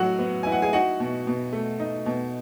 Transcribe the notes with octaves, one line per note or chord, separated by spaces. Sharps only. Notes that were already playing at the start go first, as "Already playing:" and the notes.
Already playing: A2 F#3 F#4 F#5
B3
E4 G#5
F#5
G#4 G#5
D#4 F#4 F#5
B2
B2
A3
D#4
B2